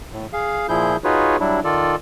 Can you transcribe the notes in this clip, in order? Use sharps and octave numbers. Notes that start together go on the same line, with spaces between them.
A2
G#4 F5
A#2 F3 E4 G#4 G6
D#4 F4 F#4 G#4 B4 C#5
F#3 G3 D4 E4
D#3 F4 A4 D5